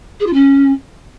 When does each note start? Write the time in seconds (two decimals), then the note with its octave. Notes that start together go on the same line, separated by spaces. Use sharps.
0.19 G#4
0.26 F4
0.33 C#4